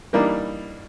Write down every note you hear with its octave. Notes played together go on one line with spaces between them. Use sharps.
E3 G3 A#3 D4 D#4